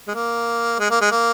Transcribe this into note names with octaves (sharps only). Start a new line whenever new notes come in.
G#3
A#3
G#3
A#3
G#3
A#3